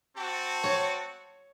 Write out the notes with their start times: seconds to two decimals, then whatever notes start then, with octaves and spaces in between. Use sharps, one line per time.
0.15 C4 F#4 A5
0.64 C#5